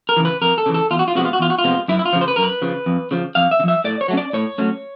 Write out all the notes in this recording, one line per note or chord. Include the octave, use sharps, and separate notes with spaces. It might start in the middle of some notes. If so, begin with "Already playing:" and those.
A#4
C#3 E3
B4
F2 A#4
A4
C#3 E3
A4
E2 F4
F#4
F4
C3 F3 G#3 B3 F#4
F4
F#4
E2 F4
F#4
F4
C3 F3 G#3 B3
F#2 E4
E4
F4
C#3 F3
C5
B4
F#2 A#4
B4
C#3 F3
F2
C#3 F3
F2 F5
E5
C#3
F3 E5
A2 D5
C#5
F#3 A3 C#4 D5
A2 C#5
F#3 A3 C#4